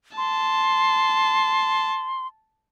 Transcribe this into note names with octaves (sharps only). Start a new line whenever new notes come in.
A5 C6